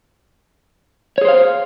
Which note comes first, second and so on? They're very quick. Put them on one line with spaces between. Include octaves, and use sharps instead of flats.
C#5 G#4 C5 F5